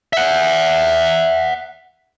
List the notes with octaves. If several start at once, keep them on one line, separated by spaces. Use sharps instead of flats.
E5 F#5